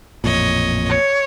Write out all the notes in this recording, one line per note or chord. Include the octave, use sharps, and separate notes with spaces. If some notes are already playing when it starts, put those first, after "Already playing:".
A1 F2 A#2 C#5 D#5
C#5